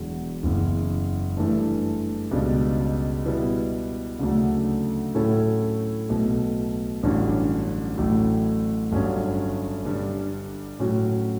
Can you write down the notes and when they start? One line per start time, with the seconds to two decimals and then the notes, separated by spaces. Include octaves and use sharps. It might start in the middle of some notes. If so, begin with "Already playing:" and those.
Already playing: E1 E2 D3 F#3
0.43 F#1 E2 C#3
1.37 G2 E3 A3
2.31 C#2 B2 G3 D4
3.25 B2 G3 B3 E4
4.19 D2 C#3 F#3 A3 D4
5.14 A2 F#3 C#4 E4 A4
6.09 B1 B2 A3
7.03 A1 G2 D3 F#3 C#4
7.97 A1 A2 F#3
8.92 G1 G2 F#3 C#4
9.85 G2 D3 G3
10.79 A2 F#3 C#4 F#4